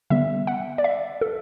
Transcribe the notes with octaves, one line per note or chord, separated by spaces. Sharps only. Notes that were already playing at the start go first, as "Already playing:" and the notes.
D3 G3 B3 E5
F#5
D5
E5
A4